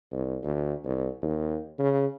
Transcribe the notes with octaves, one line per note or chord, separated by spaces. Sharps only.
C2
D2
C2
D#2
C#3